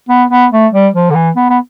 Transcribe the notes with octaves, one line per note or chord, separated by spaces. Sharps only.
B3
B3
A3
G3
F3
D3
E3
B3
B3